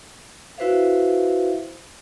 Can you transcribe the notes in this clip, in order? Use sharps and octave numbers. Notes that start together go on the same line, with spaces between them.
E4 F#4 B4 C5 E5 F5